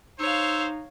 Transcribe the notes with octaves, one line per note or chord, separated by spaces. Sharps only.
D#4 C5 C#5 F5 E6